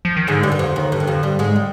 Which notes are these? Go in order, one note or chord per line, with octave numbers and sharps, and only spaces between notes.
F3
D#3
G#2 D3 G#3
G2 G3
D#3
F2 F3
D#2 D#3
G2
D#3
F2 F3
G2 G3
G#2 G#3
G3